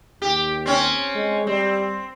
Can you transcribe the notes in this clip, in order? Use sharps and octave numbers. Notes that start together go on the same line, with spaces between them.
D#2 G4
C4 C#4
G#3
G3 C4